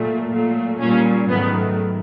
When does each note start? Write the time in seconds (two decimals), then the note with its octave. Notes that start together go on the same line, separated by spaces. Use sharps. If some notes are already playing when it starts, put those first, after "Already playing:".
Already playing: A#2 F#3 A3
0.31 A#2 F#3 A3
0.80 A#2 G3 C#4
1.29 G#2 D#3 F#3 A3 B3